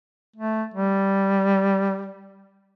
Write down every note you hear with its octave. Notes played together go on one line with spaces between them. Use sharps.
A3
G3